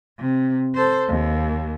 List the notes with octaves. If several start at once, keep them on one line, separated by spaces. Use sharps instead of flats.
C3
A4 C5
D#2